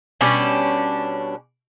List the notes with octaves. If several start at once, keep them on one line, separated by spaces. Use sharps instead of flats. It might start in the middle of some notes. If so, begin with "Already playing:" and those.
B2 G3 C#4 D4